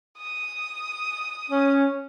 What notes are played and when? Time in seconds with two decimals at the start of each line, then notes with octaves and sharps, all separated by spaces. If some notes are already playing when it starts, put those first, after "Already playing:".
0.18 D#6
1.50 C#4